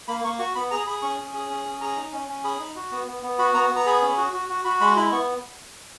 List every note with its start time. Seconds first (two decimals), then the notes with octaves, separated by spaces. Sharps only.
0.08 A#3 B5
0.24 A#3 C#6
0.39 F#4 C#6
0.55 B3 B5
0.71 G#4 A#5
0.87 G#4 B5
1.02 C#4 C#6
1.18 C#4
1.34 G#4
1.50 C#4
1.65 C#4
1.81 G#4 A#5
1.97 D#4
2.13 C#4
2.28 C#4
2.44 G#4 B5
2.60 D#4
2.76 F#4
2.92 B3
3.08 B3
3.23 B3
3.39 F#4 B5
3.54 B3 A#5
3.70 B3
3.77 A#5
3.86 G#4 B5
4.02 C#4
4.17 F#4
4.33 F#4
4.49 F#4
4.65 F#4 B5
4.81 G#3 B5
4.97 E4 B5
5.12 B3 C#6